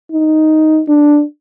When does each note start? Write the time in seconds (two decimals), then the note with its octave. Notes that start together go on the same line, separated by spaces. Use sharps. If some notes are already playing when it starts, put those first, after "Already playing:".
0.12 D#4
0.88 D4